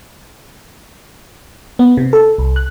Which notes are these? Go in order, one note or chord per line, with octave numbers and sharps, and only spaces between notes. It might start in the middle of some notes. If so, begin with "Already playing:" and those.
B3
C3
A4
C2
F#6